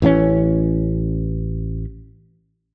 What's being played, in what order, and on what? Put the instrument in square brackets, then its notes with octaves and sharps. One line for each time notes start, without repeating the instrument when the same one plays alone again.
[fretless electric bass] A1 E3 A#3 C#4